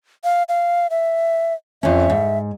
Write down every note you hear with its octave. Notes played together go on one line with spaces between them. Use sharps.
F5
F5
E5
F2 C#4 E5
G#2